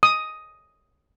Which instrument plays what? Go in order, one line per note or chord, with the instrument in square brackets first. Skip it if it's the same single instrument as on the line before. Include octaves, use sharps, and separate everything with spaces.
[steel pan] D#6